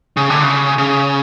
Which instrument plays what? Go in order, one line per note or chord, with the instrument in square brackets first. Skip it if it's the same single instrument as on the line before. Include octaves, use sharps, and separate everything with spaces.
[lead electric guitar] C#3
D3
C#3
C#3